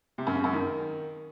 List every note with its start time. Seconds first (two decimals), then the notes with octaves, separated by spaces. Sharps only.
0.18 C3
0.27 F#2
0.35 C#3
0.44 F#2
0.53 D#3